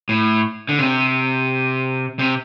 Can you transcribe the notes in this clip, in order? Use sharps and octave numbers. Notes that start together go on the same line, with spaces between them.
A2
D3
C3
C3